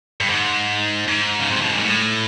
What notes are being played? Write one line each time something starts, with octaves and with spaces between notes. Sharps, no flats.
G2
G#2
G#2
C#3
C3
B2
A#2
A2